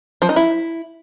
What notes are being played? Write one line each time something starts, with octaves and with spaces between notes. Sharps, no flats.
F3
D#4
E4